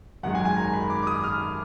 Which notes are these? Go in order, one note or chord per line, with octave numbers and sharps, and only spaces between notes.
G#1 F#2 D#3 G#3 F#5
G#5
G#5
A#5
B5
D6
D6
D#6
F6